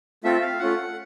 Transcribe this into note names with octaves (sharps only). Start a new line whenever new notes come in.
A3 C4 F4 A4 E5
F5
A3 C#4 F4 F#5